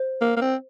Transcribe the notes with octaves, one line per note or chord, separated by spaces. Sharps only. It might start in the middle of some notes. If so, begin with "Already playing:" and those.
Already playing: C5
A#3
A#3
C4